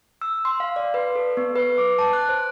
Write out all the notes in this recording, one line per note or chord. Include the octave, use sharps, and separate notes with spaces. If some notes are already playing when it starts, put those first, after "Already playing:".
E6
C6
F5
D5
B4
A4
B3
B4
D6
A5
F#6
C5